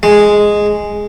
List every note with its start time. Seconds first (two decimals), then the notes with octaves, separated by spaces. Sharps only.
0.03 G#3